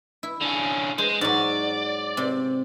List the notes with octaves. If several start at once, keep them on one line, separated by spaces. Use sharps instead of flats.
E4
D3 C#4
G#3 C5
G#2 F#3 D5
C3